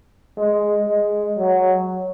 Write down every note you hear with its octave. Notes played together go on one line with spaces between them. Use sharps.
G#3
G#3
F#3